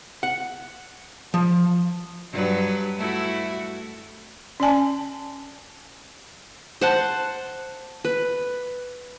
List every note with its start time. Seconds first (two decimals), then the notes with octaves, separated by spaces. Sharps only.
0.23 F#5
1.34 F3
2.31 G2 F#3 B4
2.98 A3 E4 F#4
4.60 C#4 D5 G#5 A5
6.81 C5 F#5 A5
8.05 B4